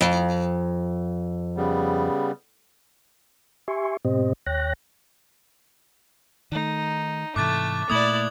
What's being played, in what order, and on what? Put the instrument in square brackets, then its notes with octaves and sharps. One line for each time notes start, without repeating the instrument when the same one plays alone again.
[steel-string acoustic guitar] F2
[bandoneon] C#3 G3 B3
[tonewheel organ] G4 E5 G#5 C6 C#6
G#2 B2 C4 G4 C5 D#5
D#2 C#5 G5 F#6 A#6
[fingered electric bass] D#3 A3 [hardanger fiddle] D#4
[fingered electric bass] G#2 C3 E3 [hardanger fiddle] A3 [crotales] D6 F#6 A6
[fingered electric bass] A#2 A3 A#3 [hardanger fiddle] E4 D5 [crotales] D#6 G#6 F#7